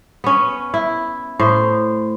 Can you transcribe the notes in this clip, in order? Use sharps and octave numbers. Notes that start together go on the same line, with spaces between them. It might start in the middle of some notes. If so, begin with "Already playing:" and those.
B3 C#4
E4
A2 C5